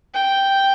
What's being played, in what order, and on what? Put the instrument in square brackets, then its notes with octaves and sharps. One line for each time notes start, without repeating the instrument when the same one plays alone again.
[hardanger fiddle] G5